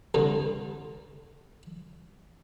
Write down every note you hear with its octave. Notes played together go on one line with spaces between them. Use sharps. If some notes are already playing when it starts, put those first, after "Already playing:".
C2 G2 D3